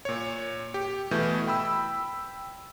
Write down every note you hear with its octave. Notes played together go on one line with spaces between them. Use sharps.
A#2 C#5
G4
B2 E3 A3 G6
G5 B5 E6